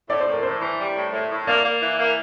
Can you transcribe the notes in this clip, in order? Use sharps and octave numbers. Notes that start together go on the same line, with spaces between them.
A2 D5
C5
A2
A#4
A2 C5
E3
G3
A2
A2
A2
A#3 D5
A#3
E3
A#3